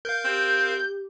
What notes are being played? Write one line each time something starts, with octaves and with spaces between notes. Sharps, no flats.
A#4 F5 G6
C4 G4